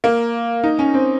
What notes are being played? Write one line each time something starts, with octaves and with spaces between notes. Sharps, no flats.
A#3
D#4
C#4
C4